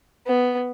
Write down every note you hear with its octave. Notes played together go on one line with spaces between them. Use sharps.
B3